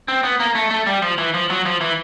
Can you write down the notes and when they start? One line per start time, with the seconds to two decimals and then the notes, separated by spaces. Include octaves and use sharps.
0.08 C4
0.24 B3
0.40 A#3
0.55 A3
0.71 A3
0.87 G3
1.02 F3
1.18 E3
1.34 F3
1.50 F#3
1.65 F3
1.81 E3